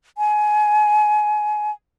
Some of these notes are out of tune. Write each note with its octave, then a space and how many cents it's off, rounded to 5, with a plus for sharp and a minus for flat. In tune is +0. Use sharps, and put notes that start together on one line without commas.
G#5 +25